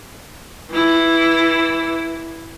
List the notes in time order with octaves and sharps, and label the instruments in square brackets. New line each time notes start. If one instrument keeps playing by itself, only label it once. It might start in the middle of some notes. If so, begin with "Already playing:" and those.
[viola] E3 E4